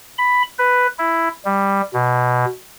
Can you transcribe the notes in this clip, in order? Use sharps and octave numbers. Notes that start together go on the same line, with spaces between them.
B5
B4
E4
G3
B2